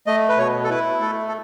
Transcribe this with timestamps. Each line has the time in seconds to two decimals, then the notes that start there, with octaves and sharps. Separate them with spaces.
0.07 A3 D#5
0.29 B4
0.37 B2 C#5
0.64 A4
0.70 E4 B4
1.00 A3 A4
1.28 A4